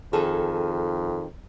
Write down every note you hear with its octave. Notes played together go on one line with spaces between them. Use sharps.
F2 D#3 G#4 A4